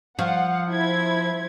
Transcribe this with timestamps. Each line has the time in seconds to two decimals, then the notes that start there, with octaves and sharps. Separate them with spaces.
0.19 F3 F5 F#5
0.69 E4 C5 G#6